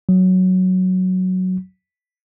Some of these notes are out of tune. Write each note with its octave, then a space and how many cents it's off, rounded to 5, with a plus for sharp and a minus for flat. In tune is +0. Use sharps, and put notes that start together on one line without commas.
F#3 +0